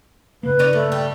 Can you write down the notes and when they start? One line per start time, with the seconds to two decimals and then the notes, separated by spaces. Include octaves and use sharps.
0.43 G2 C#3 A#3 B4
0.59 C#4 D#4 D5
0.73 A3 B3
0.92 G3